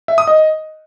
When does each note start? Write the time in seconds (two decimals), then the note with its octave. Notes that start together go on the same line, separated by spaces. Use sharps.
0.08 E5
0.18 D#6
0.27 D#5